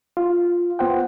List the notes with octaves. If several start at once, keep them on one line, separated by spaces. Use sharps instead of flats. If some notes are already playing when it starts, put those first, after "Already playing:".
F4
B3 F4 C5 F#5 G5